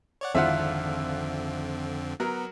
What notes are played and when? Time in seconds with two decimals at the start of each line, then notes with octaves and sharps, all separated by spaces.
0.21 C#5 D5 F#5
0.35 G#1 F2 D3 C4 E4 F4 E5 F#5
2.20 F#3 B3 A#4